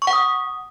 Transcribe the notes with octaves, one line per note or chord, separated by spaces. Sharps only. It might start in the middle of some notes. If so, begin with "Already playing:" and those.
C#6
F#5
D#6